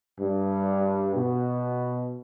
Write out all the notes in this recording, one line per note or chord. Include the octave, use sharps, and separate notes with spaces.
G2
B2